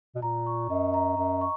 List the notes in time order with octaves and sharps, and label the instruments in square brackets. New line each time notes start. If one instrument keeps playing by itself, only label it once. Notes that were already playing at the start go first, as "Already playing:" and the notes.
[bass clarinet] B2
[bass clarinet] A#2 [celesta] A#5
[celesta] C#6
[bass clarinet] F#2 [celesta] D#5
[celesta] A#5
[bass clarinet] F#2 [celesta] A#5
[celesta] C#6